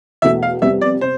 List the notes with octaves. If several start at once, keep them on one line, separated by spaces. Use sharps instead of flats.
E2 B2 A3 E5
F5
F2 C3 G3 B3 E5
D5
C3 C5